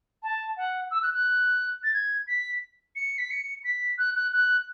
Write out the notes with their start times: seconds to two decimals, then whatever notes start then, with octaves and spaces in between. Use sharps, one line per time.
0.23 A5
0.57 F#5
0.91 E6
1.03 F#6
1.14 F#6
1.84 A6
1.94 G#6
2.27 B6
2.96 C#7
3.18 B6
3.31 C#7
3.64 B6
3.99 F#6
4.16 F#6
4.33 F#6